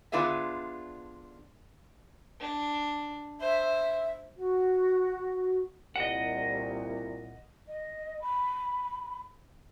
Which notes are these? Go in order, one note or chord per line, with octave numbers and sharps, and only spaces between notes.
D3 B3 D4 F4 G#4 E5
D4
C5 E5
F#4
C2 A#2 D#5 F#5
D#5
B5